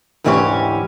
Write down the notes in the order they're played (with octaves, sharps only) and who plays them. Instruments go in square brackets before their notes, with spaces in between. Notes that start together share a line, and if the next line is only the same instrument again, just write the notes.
[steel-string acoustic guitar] D2 G#2 E3 C#4 G4 C#5